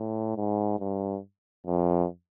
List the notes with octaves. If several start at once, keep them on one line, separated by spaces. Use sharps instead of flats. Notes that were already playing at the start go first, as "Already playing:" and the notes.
Already playing: A2
G#2
G2
F2